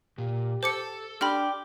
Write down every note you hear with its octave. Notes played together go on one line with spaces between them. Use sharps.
A#2 G4
A4 C5 D6 C#7
D4 G4 B5 C6 F6